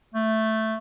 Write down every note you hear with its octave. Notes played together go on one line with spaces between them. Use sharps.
A3